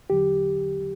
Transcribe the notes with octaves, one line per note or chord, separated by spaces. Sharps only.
E2 D3 F#3 G4